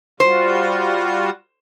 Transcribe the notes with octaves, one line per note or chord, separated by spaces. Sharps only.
G3 F4 F#4 C5